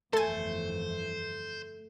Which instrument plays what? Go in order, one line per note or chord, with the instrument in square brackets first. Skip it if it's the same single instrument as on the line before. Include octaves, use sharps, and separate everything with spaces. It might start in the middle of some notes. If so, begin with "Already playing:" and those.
[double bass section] G1 F2 E3 [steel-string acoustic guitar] A3 [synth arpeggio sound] A4 G#5 [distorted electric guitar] C5